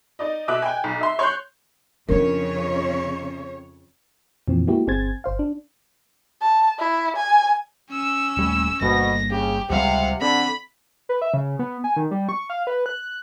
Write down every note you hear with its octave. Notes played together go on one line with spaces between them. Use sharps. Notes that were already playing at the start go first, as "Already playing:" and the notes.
D#4 D5 D#5
B2 E5 D6 F#6
G5 G#5
B1
E5 C6
C#5 C6 C#6 F#6 G6
F2 C#3 C#4 D4 A#4 C#5
F2 A#2 E3 F3 C4
G#3 A#3 B3 E4 F#4 G4
G1 C4 G#4 C5 G#6 A6
G1 C5 F5
D4
A5
E4
G#5
C#4 E6
D#1 G3 A3
G1 D2 G2 B2 A#3 A#6
C#3 G4
C#2 C3 G3 G#3 F5 F#5
D3 C4 B5
B4
E5
C#3
B3
G#5
D#3
G3
C#6
F5
B4
F#6